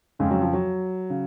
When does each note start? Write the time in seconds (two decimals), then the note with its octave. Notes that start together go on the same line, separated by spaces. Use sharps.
0.19 F2 C#3 G#3
0.31 F#3
0.42 F3
0.54 F#3
1.10 C#3